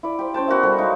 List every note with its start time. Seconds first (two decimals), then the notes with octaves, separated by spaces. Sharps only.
0.03 E4 D5
0.19 G4 C5
0.34 C#4 C5 G5 A5
0.48 B3 F#4 A#4 E5
0.63 G3 F#4 A4 C5
0.78 F#3 G#3 D#4 F5